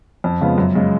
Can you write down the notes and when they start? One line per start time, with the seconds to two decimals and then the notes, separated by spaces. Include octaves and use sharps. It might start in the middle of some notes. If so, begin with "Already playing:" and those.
0.24 F2
0.41 C#3 G#3 B3 F4
0.58 F#2
0.75 C#3 G#3